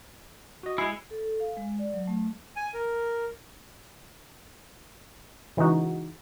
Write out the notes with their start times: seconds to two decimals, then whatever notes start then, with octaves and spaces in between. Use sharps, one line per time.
0.63 F#4 D#5
0.78 G#3 E4 G#5 C7 C#7
1.10 A4
1.24 A4
1.40 F5
1.57 G#3
1.79 D5
1.94 F#3
2.07 A3
2.56 G#5
2.74 A#4
5.57 C#3 E3 G#3 D#4 F#4